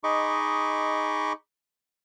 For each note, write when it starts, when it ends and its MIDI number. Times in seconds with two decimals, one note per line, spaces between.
0.04 1.33 63
0.04 1.33 68
0.04 1.33 75
0.04 1.33 83
0.04 1.33 85
0.04 1.33 86